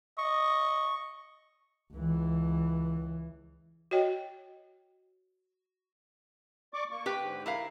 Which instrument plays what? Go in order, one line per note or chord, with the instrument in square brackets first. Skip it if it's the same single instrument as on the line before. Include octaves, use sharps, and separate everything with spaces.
[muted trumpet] D#5 [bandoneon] C#6
[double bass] C#2 E3
[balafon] F#4 C#5 D#5 G5
[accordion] D5 C#6 D6
A#3 C#6
[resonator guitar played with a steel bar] G4 B4 G5
[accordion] G#2 D3
[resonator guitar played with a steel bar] E4 A#4 F5